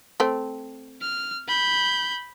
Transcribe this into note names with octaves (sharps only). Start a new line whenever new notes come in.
A3 C4
F6
B5 G6